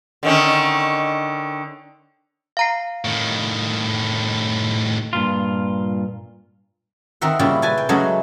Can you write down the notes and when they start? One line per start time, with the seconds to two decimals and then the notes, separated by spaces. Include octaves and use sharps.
0.23 D3 D#3 C#4
2.57 F5 A#5 C7
3.05 A2 D#3
5.13 G2 A#2 F4
7.21 D#3 C4 A#4 E5 F#5
7.39 A#2 C#3 G3 E4 F4
7.62 B4 G#5 A5
7.78 G5
7.89 C#3 F#3 G#3 A3